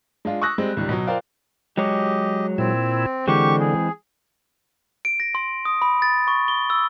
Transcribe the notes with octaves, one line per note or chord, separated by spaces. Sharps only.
G#3 D4 F4
C#6 D#6 E6 F#6 A#6
G3 G#3 C4
C#2 D#3 G3
B2 F#3
F4 A#4 C5 D5 F5 G5
F#3 G#3 G4 C#5 D#5
A#2 C4 E4
D3 E3 G#3 C4 G4 C#6
G#4
D7
A#6
C6
D#6
B5
A6
C#6
G7
E6